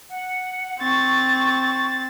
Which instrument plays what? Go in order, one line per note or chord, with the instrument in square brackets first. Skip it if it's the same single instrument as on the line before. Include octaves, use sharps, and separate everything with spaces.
[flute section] F#5
[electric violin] C4 A6 [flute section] C#6